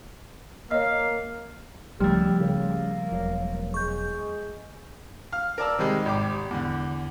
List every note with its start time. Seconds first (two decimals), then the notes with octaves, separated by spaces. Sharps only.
0.71 A#3 C#5 D#5 F5
2.00 C#2 F3 G3 A3 G4
2.40 C#3 A#3
3.12 E1 F#3
3.74 G#3 C#6 G6
5.32 F5 F6
5.58 A#4 D5 A5 E6
5.78 C3 D#3 G3 G#3
6.05 G#1 G4 D6
6.51 E2 D3